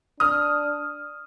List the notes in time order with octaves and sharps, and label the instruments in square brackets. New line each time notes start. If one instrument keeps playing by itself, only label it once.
[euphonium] D4 [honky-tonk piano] D#6 F6